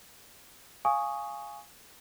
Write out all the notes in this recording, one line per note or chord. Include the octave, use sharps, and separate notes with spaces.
F5 G#5 C#6 D#6